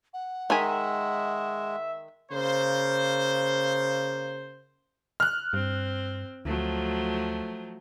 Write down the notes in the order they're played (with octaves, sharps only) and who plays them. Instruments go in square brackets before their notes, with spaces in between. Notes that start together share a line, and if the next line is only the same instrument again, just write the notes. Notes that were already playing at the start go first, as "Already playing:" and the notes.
[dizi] F#5
[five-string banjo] D#3 A#4 G#5 [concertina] G#3 [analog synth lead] E5
[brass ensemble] C#3 A#3 C5
[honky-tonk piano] F6 F#6
[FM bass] G2 [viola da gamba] C4
[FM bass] D2 [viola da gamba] F3 F#3 A3